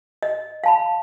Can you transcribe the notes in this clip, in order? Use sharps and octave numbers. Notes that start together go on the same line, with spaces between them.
D#5
F5 A5 B5